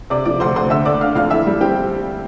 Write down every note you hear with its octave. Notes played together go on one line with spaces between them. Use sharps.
C3 D5 D6
F3 D5 D6
D2 C5 C6
D2 C5 C6
D3 E5 E6
A3 D5 D6
D4 F5 F6
F2 F5 F6
E3 E5 E6
G3
C4 G4 G5